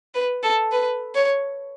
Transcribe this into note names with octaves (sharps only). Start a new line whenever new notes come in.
B4
A4
B4
C#5